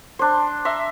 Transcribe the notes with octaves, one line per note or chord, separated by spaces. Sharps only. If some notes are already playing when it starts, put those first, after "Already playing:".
D4 C5
E5 A#5 C6